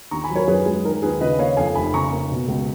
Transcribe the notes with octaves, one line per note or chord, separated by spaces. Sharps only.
D#2 A#5 C#6
G#5 B5
F#3
A#4 C#5
F#2 G#4 B4
G#3 G#4
D#3 A#4
D#2 G#4 B4
C#3 B4 D#5
A#3 C#5 F5
F2 F5 G#5
F1 G#5 B5
C#3 A#5 C#6
A#3
B2
C#2